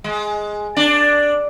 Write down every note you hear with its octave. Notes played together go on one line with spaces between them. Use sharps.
G#3
D4